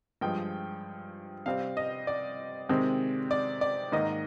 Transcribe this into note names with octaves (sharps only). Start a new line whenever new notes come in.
G2 F3 G#3 G5
C3 G3 C4 F5
D#5
D5
C3 D#3 G#3 C4
D5
D5
G#2 D#3 A#3 D#5